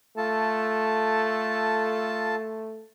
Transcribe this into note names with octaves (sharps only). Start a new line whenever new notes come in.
A3 F4 A4 A5